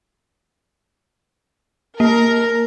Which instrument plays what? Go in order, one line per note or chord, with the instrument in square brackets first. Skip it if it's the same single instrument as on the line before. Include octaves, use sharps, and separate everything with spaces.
[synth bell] A#3 [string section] A#4